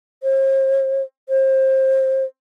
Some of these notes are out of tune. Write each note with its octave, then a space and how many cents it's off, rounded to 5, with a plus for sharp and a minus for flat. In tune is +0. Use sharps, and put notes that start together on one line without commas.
C5 +45
C5 +25